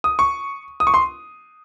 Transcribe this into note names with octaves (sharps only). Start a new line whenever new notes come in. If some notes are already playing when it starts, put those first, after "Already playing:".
D#6
C#6
D#6
C#6
C6